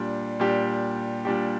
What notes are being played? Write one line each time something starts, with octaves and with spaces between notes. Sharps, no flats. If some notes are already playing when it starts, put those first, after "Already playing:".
Already playing: A#2 G3 D4 G4
A#2 G3 D4 G4
A#2 G3 D4 G4